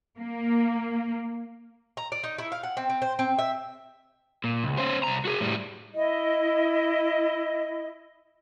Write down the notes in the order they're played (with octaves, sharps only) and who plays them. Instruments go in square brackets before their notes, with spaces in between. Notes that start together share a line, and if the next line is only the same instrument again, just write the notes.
[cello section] A#3
[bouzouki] A#5
D5
D#4
E4
F5
F#5
C4
C4
C5
C4
E5
[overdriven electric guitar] A#2
C#2
C#4 C5
C2 A#5
F#4 G#4
A2 G3
[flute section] E4 D#5